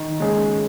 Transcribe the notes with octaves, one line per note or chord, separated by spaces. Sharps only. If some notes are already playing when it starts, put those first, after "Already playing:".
Already playing: D#3
G#3 C#4 G#4